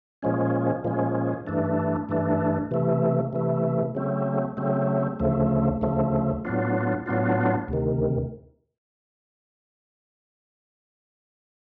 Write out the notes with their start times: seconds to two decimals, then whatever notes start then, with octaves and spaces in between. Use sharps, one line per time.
0.23 A#2 F3 G#3 C#4
0.84 A#2 F3 G#3 C#4
1.47 G2 E3 A3 D4
2.09 G2 E3 A3 D4
2.71 C3 E3 A3
3.33 C3 E3 A3
3.95 C#3 F#3 A3 C4
4.57 C#3 F#3 A3 C4
5.20 D2 C#3 F3 A3
5.81 D2 C#3 F3 A3
6.45 A2 F#3 B3 D4 F4
7.06 A2 F#3 B3 D4 F4
7.68 D2 C3 D#3